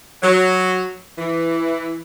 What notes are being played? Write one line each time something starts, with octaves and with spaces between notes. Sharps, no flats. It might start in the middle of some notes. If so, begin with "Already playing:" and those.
F#3
E3